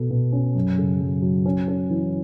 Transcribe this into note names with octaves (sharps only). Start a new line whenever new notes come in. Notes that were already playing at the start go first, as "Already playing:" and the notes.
Already playing: B2 A4
B2
C#4
F#2
C#3
F#2
F#3
C#4
C#4
E3